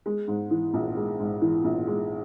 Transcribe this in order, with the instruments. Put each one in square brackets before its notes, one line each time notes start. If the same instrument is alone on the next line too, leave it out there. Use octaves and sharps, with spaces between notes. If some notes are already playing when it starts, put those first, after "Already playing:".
[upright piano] G#3
G#2
E3
A#1
G#3
G#2
E3
A#1
G#3